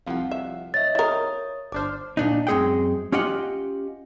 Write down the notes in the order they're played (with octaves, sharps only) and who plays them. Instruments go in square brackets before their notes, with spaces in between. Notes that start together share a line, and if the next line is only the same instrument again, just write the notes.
[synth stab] C2 F2 F3 [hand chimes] F5 F#5
[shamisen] E5
[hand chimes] C#5 D#5 E5 [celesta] A6
[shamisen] E4 A#4 [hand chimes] C#5 D#6
[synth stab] G1 D4 C5 [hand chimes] D6 F6
[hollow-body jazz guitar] A#2 D4 D#4
F#2 G#3 C4 G#4 F#5 G5
C#4 F4 G4 D#5 F#5